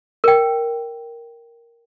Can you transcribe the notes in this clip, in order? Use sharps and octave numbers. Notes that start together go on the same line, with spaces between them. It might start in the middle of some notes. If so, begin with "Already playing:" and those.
A#4 G5